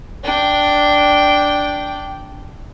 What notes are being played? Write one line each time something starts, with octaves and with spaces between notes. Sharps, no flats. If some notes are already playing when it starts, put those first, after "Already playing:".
D4 G5